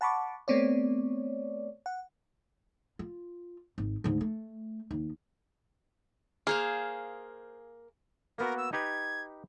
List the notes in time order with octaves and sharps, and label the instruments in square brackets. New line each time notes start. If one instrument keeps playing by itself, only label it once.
[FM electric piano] F#5 A5 B5 C#6 D6
A3 B3 C4 C#5 D5
F#5
[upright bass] F4
G#1
D2 G#2
A3
D#2
[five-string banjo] A#3 [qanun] G#4 C5 F5
[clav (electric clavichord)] A#3 B3 F#4 [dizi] A#4
[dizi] E6
[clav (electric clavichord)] D#4 G4 B4 [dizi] G#6